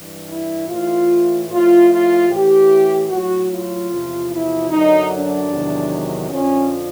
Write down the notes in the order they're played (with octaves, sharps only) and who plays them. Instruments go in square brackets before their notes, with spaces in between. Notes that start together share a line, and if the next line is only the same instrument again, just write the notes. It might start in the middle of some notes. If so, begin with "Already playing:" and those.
Already playing: [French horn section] G2 E3
E4
A2 E3 F4
A2 F3 F4
F4
A2 E3 G4
A2 F#3 F#4
F4
E2 C3 F3
E4
F#2 D3 F#3 D#4
D4
E2 C3 D#3 F#3
F2 D3 F3 C#4